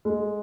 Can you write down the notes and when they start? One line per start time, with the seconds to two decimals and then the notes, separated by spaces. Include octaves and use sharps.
0.05 G#3